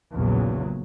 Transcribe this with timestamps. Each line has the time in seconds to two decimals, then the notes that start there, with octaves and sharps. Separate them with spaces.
0.13 A#1 E2 A#2 C#3 F#3